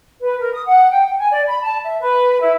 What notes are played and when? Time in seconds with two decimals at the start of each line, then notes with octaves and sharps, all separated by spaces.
0.20 B4
0.39 A#4
0.53 D#6
0.66 F#5
0.90 G5
1.17 G#5
1.31 D5
1.48 B5
1.63 A5
1.84 E5
2.00 B4
2.41 E4